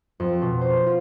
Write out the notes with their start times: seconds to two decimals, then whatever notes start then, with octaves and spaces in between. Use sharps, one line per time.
0.20 F2
0.42 B2
0.61 C5
0.86 F4